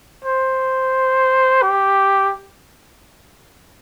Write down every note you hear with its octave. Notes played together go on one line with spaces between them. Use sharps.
C5
G4